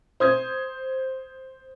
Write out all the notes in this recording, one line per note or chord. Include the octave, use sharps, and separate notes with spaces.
C5 D#6 G#6